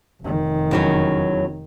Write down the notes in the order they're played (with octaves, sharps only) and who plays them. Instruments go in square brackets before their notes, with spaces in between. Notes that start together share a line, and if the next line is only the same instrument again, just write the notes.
[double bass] F1 D#3
[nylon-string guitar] E2 F#3 C#4